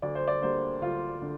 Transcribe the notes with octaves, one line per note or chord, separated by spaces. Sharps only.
D2 D5
C5
D5
D3 G3 A#3 C5
D2 F4
D3